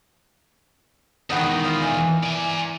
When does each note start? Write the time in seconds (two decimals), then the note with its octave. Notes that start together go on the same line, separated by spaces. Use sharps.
1.30 E2 B2 D#3 B3 D#4
1.64 F4 D#5
1.82 E3
2.23 D5 G#5